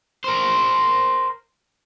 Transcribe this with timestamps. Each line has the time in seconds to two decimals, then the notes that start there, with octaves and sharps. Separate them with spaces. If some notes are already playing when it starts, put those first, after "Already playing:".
0.24 A#4 C5